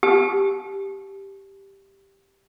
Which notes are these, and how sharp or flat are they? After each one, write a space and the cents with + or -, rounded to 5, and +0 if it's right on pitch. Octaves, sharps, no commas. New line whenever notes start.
G4 +0 A5 -40